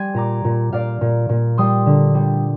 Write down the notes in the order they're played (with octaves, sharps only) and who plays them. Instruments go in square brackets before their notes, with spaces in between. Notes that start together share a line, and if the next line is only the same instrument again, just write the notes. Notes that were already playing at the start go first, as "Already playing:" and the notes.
Already playing: [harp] G3 G#5 C6
A#2 A#5 D6
A#2
A#2 D5 F5
A#2
A#2
G3 C6 D#6
D3
G3